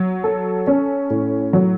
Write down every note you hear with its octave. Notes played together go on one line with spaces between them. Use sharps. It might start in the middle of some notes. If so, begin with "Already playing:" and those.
Already playing: F#3
A4
C#4
A2
F#3